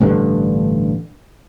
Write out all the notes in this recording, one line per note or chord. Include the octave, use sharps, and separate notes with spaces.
A1 G2 D3